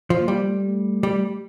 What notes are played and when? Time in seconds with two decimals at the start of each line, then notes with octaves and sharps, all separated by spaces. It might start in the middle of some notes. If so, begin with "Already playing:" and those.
0.10 F3
0.19 A#3
0.28 G3
0.47 A3
1.03 G3